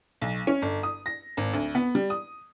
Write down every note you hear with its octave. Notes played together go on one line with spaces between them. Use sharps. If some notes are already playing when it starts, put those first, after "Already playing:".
B1
C#4
G1
D#6
A#6
G#1
D2
B3
G3
D#6